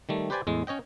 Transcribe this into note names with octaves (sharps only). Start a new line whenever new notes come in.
D#3 G3 A3
G4 B4 C5 D5 G5 G#5
E2 A2 G#3
C#4 C#5 D#5 G5